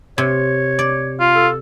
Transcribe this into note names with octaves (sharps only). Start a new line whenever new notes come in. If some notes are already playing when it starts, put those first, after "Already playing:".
C3 C#5
D5
F4
A4